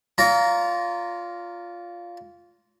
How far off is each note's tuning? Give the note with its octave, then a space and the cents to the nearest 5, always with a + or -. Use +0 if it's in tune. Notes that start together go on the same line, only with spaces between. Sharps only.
F4 +0 D5 -45 A#5 +0